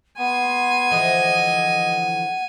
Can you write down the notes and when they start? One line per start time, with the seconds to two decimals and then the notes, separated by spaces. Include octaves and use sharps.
0.18 B3 F#5 G#5 C6
0.91 D3 E3 F3 D#5